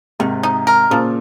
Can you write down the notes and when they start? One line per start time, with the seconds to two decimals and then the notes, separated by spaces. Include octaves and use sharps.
0.19 G#2 C3 D#3
0.43 D#4
0.67 A#4
0.90 A#2 C#3 F3